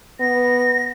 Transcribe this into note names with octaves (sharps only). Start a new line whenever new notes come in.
B3 A#6